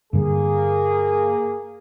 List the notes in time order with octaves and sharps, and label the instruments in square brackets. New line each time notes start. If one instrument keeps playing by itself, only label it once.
[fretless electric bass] G2 D3 G3 [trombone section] A#3 G#4